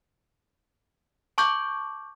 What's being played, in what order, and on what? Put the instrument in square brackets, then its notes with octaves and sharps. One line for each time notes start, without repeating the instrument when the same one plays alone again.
[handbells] A5 C#6 D6 G6